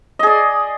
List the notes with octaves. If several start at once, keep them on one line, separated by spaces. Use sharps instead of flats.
G#4 D5 D#5